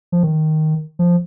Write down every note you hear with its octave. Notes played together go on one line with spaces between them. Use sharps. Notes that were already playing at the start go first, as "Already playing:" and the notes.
F3
D#3
F3